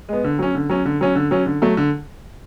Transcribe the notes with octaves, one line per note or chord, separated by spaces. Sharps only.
G#3 B3
D3
F#3 C#4
D3
F#3 C#4
D3
F#3 C#4
D3
F#3 C#4
D3
F#3 A3
D3